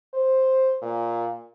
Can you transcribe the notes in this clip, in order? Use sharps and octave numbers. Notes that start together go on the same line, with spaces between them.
C5
A#2